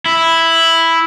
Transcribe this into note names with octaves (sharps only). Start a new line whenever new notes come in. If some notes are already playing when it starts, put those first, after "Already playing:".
E4